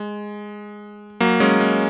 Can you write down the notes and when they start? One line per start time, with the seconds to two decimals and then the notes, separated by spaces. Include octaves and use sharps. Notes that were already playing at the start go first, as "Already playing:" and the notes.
Already playing: G#3
1.20 F#3 A#3
1.40 G#3 C#4
1.60 G#3